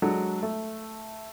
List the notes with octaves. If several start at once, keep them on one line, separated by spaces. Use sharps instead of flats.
F#3 G#3 D4 A4
A3